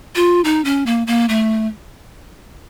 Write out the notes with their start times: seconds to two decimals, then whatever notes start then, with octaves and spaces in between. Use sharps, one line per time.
0.15 F4
0.44 D#4
0.65 C#4
0.86 A#3
1.07 A#3
1.29 A3